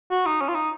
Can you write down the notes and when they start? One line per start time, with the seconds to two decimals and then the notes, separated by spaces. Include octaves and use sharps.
0.11 F#4
0.26 D#4
0.41 C#4
0.49 F4
0.55 D#4